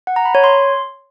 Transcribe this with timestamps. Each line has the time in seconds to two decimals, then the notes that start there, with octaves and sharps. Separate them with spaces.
0.07 F#5
0.16 A#5
0.25 B5
0.35 C#5
0.44 C6